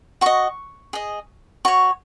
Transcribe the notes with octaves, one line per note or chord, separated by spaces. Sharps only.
F#4 D#5 C#6
G#4 D#5
F#4 C#5 C#6